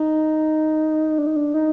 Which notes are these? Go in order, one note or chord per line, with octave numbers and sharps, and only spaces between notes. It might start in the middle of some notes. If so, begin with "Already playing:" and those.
Already playing: D#4
D4
D#4
D4
D#4